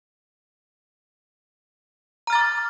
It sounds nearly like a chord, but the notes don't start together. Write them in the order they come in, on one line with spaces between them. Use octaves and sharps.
A#5 F6 A6 D6